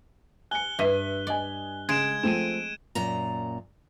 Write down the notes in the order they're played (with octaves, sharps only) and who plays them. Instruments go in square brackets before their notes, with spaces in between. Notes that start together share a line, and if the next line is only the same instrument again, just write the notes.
[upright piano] G#5 C#7 [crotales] F#6 G7
[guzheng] G2 [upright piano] E5 B6 D#7
[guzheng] D5 [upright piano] D#5 G#5
[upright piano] C#3 [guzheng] G#3 [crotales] G#6 D7 E7
[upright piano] F3 A3 C4 [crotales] D#7 E7
[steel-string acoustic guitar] F#2 A#2 A#5